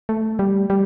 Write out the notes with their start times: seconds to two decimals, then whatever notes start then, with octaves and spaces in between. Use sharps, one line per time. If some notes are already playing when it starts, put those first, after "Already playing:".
0.09 A3
0.39 G3
0.70 G3